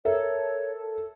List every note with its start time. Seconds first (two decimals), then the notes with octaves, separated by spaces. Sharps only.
0.05 A4 A#4 C#5 E5